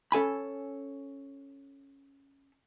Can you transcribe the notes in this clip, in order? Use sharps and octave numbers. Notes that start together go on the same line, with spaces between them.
C#4 A4 G#5 B5